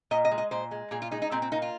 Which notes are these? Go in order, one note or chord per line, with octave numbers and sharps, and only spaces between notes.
A#2 D#5
D#5
G#3
D#5
A#2 C5
G#3
A#2 G#4
F4
G#3 D#4
D#4
A#2 C4
C4
A#3 D#4
F4